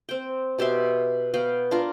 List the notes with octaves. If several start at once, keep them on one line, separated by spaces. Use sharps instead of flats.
C4 G5
B2 G4 E5 C6
B3 F#4 F5 G5
D4 F4 A#4